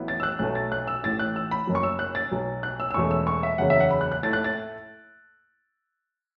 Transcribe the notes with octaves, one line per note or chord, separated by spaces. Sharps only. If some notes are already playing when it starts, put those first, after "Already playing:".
Already playing: A1 A2 F#3 B3 E4
A6
E6
F#6
B1 B2 F#3 A3 F#6
A6
F#6
E6
A1 A2 E3 A6
F#6
E6
B5
F#1 F#2 F#3
C#6
E6
F#6
A6
B1 B2 F#3
F#6
E6
E6
E1 E2 B2 A3 C#4 C#6
E6
C#6
E5
F#1 E2 C#3 F#3 C#4 F#5
E5
F#5
B5
F#6
F#6
A2 A3 E4 A6
F#6
A6